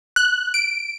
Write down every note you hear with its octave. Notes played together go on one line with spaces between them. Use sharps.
F#6
D7